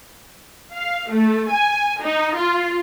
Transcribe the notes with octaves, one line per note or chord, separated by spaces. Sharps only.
F5
A3
G#5
D#4
F4